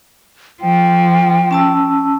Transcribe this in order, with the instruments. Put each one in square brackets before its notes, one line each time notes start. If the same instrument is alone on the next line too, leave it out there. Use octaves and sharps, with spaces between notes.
[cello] F3 [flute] G5
[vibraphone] C#4 A5 E6